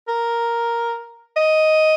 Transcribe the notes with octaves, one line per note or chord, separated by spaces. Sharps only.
A#4
D#5